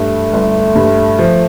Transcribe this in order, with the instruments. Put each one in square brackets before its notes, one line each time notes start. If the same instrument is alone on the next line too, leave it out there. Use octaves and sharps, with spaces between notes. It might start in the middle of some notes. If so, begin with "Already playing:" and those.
Already playing: [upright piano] G2 [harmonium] A3
[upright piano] G1
G2
F3